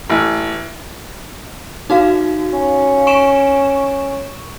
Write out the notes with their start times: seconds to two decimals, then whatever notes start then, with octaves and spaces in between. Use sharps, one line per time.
0.10 A1
1.90 D#4 F#4 F5
2.53 C#4
3.07 C#6 D7 E7